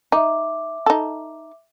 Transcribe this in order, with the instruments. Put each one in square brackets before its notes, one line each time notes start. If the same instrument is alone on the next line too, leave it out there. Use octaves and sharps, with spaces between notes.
[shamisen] D#4 [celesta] E5 D6
[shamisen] D#4 A4